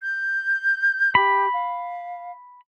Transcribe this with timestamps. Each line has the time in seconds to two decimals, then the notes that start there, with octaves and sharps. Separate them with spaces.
0.02 G6
1.15 G4 B5
1.53 F5